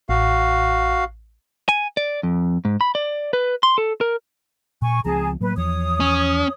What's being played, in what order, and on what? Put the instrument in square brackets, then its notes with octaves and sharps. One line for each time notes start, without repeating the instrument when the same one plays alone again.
[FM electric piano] A1 [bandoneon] F#4 F5
[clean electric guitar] G#5
D5
F2
G#2
B5
D5
B4
C6
A4
A#4
[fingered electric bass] A#2 [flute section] G#5 C#6
[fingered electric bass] C#2 F3 C4 [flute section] G#4 A5 A#5
[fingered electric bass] A2 F#3 A#3 [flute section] B4
[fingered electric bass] E2 F3 [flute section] C#5 D#6
[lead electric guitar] C#4